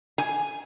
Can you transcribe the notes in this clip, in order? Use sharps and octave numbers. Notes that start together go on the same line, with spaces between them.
G#5